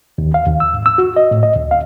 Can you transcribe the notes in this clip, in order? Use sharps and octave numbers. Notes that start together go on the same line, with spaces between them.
D#2
F5
D#2
E6
G#2
E6
F#4
D#5
A2
D#5
D2
F5